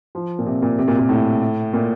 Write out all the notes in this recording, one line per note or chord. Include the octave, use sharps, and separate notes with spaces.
F3
A#2
C3
A#2
C3
A#2
A#2
A2
A#2